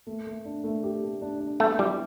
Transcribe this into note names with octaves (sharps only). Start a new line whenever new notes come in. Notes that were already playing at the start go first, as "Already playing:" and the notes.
A3
A3
D4
A3
G4
A3
D4
D4
A3 B3
G3 E4